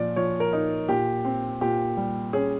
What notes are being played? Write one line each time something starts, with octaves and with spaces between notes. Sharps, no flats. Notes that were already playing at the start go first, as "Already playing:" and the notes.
Already playing: A#2 F3 D5
F3 C#5
A#4
D#4
A#2 G4
C4
A#2 G4
G3
C#4 G#4